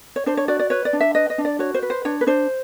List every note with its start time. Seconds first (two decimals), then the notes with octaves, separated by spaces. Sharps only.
0.16 C#5
0.26 D4 C5
0.37 C#5
0.48 F#4 D5
0.59 D5
0.70 B4 C#5
0.85 D5
0.93 D4
1.00 E5
1.15 B4 D#5
1.30 D#5
1.38 D4
1.45 D5
1.59 F#4 C#5
1.74 C5
1.82 B4
1.90 C5
2.05 D4 C#5
2.21 B4
2.27 D4 C5